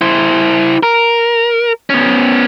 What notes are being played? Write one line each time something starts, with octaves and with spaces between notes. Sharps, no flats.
E4 C5
A#4
B3 C#4